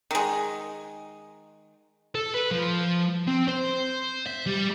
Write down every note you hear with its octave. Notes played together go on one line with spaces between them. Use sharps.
D#3 G#3
A4
B4
F3
C4
C5
E5
G3